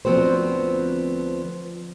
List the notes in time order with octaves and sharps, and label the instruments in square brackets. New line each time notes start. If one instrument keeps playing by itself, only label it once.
[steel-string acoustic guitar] D2 F3 B3 C4 F#4 C5